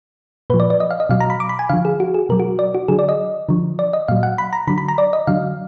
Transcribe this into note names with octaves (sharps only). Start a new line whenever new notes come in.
A#2 F3 B4
D5
D5
D#5
F5
D#5
B2 F#3 F5
A#5
B5
D6
B5
G#5
D3 F3 F5
G#4
F#4
G#4
B2 F#3 A#4
F#4
D5
F#4
D3 F#3 G#4
D5
D#5
D3 F3
D5
D#5
A#2 F#3 F5
F#5
B5
A#5
D3 F#3 B5
B5
A#5
D5
D#5
D3 F#3 F5